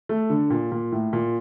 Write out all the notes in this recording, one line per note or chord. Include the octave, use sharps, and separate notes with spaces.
A3
D3
A#2
A#2
A2
A#2